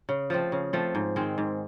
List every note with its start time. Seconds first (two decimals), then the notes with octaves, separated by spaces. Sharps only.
0.09 C#3
0.30 F3 A3 C4
0.52 C#3
0.73 F3 A3 C4
0.95 G#2
1.16 D#3 G#3 C4
1.38 G#2